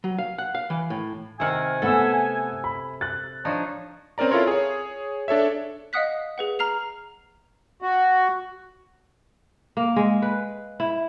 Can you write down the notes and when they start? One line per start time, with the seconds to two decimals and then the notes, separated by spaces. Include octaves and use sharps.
0.04 F#3
0.18 F5
0.38 F#5
0.55 F5
0.70 E3
0.90 A2
1.40 C3 D#3 F#5 G#5 E6 F6
1.82 A3 B3 A4 E5 F#5 E6
2.64 B5
3.01 F#6 A6
3.45 F3 D4 D#4 C#5
4.18 C4 C#4 A#4 D5 A#5
4.31 E4 F4 A4 A#4 C#5 C6
4.47 G#4 C#5
5.28 D4 A4 C#5 E5
5.93 D#5 F5 F#5 D#6 F#6 B6
6.38 G#4 B4 F#5
6.59 A#5 F6 C7 F7
7.82 F#4
9.77 A#3
9.96 G#3
10.22 B4
10.80 E4